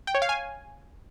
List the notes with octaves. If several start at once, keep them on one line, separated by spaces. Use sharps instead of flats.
G5
C#5
F5
G#5